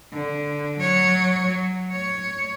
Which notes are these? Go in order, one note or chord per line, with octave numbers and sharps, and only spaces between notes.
D3
F#3 C#5
F#3
C#5